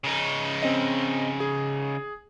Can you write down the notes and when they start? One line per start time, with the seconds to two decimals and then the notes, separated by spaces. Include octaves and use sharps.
0.04 C#3 D#4
0.63 C4 C#4 D#5
1.40 G#4